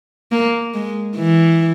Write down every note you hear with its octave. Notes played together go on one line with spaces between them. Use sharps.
A#3
G#3
E3